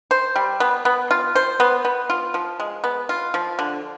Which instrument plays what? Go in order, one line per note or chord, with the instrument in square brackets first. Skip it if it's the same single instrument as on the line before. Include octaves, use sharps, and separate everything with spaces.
[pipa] C5
G3
B3
B3
F4
C5
B3
B3
F4
F3
G#3
B3
F4
F3
D3